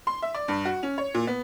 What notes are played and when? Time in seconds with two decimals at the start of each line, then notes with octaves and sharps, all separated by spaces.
0.07 C6
0.22 E5
0.34 D5
0.48 G2
0.65 F#4
0.83 C#4
0.98 C#5
1.14 A#2
1.27 B3